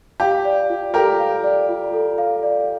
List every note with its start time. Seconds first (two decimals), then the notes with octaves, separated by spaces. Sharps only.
0.20 G4 F5
0.45 D5
0.70 F4
0.94 G4 A4 A#4
1.19 F5
1.44 D5
1.69 F4
1.93 A4
2.18 F5
2.43 D5